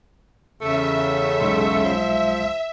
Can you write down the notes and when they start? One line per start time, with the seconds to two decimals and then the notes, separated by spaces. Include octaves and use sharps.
0.61 E2 C#3 A3 E5
1.41 B1 G#3 C6
1.84 F3